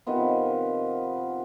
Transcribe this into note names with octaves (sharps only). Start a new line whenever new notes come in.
C3 D#3 F3 B3